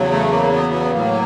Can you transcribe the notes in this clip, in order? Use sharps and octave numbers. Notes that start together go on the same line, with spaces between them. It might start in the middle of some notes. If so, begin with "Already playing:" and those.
Already playing: E2 C#3 F#3
A3
A#3
B3
B3
A2 F#3 A#3